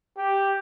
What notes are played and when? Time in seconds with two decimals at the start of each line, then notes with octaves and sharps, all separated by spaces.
0.18 G4